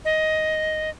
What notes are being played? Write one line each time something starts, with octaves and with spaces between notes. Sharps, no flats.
D#5